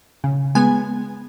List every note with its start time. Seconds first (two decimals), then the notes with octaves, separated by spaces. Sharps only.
0.24 C#3
0.55 G#3 B3 G#5